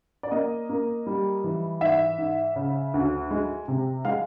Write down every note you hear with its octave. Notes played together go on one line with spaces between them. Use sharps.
D5
A#3 D#5
A#3
G3
E3
G#2 E5
G#2
C#3
D2
G#3
C3
G#3 F5